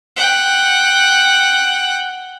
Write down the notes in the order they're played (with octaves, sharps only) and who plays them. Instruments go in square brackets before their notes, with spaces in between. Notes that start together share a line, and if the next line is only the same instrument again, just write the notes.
[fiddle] F#5 G5